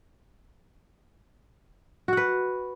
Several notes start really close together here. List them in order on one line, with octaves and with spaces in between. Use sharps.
F#4 F#5 B4